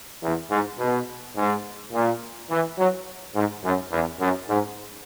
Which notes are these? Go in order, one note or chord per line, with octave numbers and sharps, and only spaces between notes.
E2
G#2
B2
G#2
A#2
E3
F#3
G#2
F#2
E2
F#2
G#2